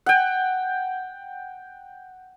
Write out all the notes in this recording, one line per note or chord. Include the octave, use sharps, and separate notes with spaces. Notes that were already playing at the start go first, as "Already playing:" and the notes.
F#5 G5